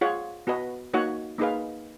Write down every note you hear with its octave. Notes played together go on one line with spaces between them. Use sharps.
F4 G#4 C#5 F#5
B3 F#4 B4 D#5
A#3 D#4 F#4 C#5 F#5
A#3 D#4 G#4 B4 F5